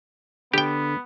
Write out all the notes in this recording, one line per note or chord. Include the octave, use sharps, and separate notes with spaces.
D3 B3 G4 G5